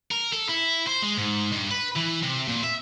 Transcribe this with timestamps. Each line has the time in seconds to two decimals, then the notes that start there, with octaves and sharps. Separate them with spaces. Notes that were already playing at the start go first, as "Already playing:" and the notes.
0.11 A#4
0.33 A4
0.49 E4
0.87 C5
1.02 G#3
1.17 G#2
1.52 G2
1.71 B4
1.96 E3
2.23 C3
2.48 A#2
2.64 E5